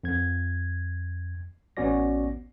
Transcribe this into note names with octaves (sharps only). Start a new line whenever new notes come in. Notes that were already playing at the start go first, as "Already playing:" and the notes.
F2 G#6
A1 B3 C#4 F#4 D5 A#6